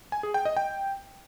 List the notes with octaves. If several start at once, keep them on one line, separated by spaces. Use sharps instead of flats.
G#5
G#4
G5
D#5
G5